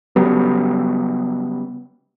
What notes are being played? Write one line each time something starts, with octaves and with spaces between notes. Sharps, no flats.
C#3 F#3 G3 B3